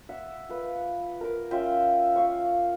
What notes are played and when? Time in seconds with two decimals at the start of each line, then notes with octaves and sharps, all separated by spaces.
0.09 E5 F#5 E6
0.49 F4 B4 F#5
1.21 A#4 D6
1.51 C#4 F4 E5 G5
2.15 F5 C#6